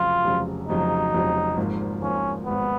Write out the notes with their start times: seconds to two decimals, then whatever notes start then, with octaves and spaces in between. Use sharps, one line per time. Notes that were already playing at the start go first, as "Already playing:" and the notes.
Already playing: F1 F2 C#3 F#3 F4
0.24 F1 F2 C#3 F#3
0.69 F1 F2 C#3 F#3 D#4
1.13 F1 F2 C#3 F#3
1.57 G#1 G#2 F3 A#3
2.01 G#1 G#2 F3 A#3 C#4
2.46 G#1 G#2 F3 A#3 B3